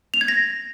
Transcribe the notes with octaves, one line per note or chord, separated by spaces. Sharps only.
F7
G#6
A#6